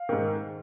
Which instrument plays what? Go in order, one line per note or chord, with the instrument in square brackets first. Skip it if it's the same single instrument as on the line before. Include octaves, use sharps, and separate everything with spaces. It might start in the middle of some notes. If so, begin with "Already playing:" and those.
Already playing: [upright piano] F5
G#2 D#3